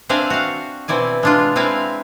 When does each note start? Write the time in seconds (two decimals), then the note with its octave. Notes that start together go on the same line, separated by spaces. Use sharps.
0.09 C4 D4 D5 E5 F5 G#5
0.30 F#4 F5
0.88 B2 C4 E4 D5 G#5
1.23 G#3 D4 F4
1.56 C4 E4 B4 F5 G#5